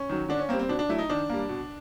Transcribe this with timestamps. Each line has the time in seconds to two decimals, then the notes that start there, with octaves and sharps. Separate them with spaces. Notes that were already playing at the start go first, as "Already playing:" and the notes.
Already playing: C#4
0.09 D#3 F#3
0.29 D3 D4
0.39 C#4
0.49 A#3 C4
0.53 G3
0.59 C4
0.69 B2 D4
0.79 D4
0.89 F#3 A3 E4
0.99 D#4
1.10 D#3 D4
1.30 G3 A#3
1.49 B2